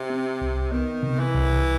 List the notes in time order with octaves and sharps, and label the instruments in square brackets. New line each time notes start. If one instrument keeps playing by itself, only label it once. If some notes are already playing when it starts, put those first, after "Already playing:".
Already playing: [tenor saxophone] C3
[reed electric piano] C4
C2
[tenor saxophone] D#3 [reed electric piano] B3
[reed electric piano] C3
[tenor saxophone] E3
[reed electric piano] C2